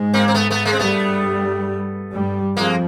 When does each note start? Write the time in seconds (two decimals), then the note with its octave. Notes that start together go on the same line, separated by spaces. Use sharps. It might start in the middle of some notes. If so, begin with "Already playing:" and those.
Already playing: G#2 G#3
0.14 A#3 C4
0.28 C4
0.34 A3 B3
0.50 A3 B3
0.65 G#3 A#3
0.73 C4
0.79 G2 G3 A3 B3
2.12 G2 G3
2.56 F2 F3 G#3 A#3